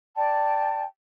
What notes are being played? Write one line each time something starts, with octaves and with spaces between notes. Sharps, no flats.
D5 G5 A5